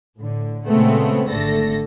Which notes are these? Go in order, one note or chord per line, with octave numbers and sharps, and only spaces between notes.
A2 D3
A#2 C#3 G#3 A3 B3 C4
G#1 D3 A3 A4 A#6